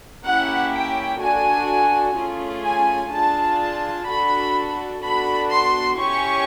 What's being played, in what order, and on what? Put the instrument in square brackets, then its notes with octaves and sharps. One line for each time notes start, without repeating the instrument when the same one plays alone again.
[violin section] A#3 C#4 E4 G4 F#5
G5
D4 F#4 A4 G#5
A3 C#4 F4 G#4
G#5
D4 F4 G#4 A5
A5
D4 F#4 A4 B5
B3 D4 F#4 A4 B5
C6
C#4 E4 G4 C#6